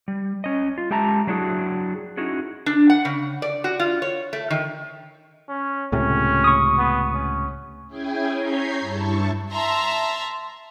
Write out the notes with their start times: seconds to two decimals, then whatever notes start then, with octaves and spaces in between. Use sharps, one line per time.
0.08 G3
0.44 C#4 D#5
0.78 F4
0.91 G#3 G4 E5 A5 A#5
1.27 F#3 D4 E4 F#4 G#4
2.17 C#4 D#4 E4 F#4 G#4
2.66 D4
2.90 F#5
3.05 C#3
3.42 D5
3.64 F#4
3.80 F4
4.02 C#5
4.33 A3
4.51 D#3
5.49 C#4
5.92 C#2 A2 C3 C#4
6.44 C#6 D#6
6.78 B3
7.14 C#4
7.87 C#4 E4 G#4 G5 G#5
8.34 C#5 A#5 G6 G#6 B6 C7
8.80 G2 E4 A5 C#6
9.51 E5 A5 A#5 C6